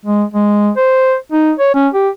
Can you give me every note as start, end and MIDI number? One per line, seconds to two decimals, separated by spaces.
0.05 0.23 56
0.34 0.70 56
0.77 1.15 72
1.32 1.52 63
1.59 1.70 73
1.74 1.88 61
1.94 2.09 67